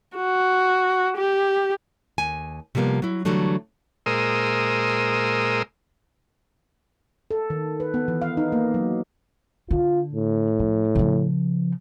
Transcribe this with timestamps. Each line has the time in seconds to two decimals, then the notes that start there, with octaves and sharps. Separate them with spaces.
0.16 F#4
1.17 G4
2.18 D#2 G#5
2.75 C3 F3 G3 A#3 B3
3.02 F#3 E4
3.25 D3 E3 F#3 G3 A3 D4
4.06 A#2 G#3 A#4 C5 D#6 E6
7.31 A4
7.50 D#3
7.80 B4
7.94 B3
8.08 E3
8.22 F5
8.37 D#4
8.52 A#3
8.74 F#3
9.71 D3 F4
10.12 A2
10.59 F3
10.95 C#3 F3